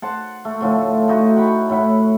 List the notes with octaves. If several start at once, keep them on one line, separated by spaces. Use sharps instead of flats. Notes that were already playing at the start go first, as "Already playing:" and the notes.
C5 F#5 A5
A3
A2 D3 F3 A3
A3 D#4 F#4
F#5 G5 B5 C#6
A2 E4 F#5 B5